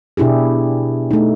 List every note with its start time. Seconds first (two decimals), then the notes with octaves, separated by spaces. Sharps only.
0.17 B2 D4 E4 G4 G#4
1.11 A3 D#4